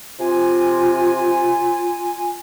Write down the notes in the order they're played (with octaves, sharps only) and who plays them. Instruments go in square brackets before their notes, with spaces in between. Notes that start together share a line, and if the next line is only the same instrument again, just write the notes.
[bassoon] C3 [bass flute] F4 [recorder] G#5